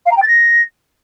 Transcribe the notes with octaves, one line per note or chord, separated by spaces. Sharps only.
F5
A#5
G5
A6
A#6